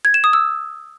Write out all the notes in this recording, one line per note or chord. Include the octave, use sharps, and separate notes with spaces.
G#6
E7
D#6
E6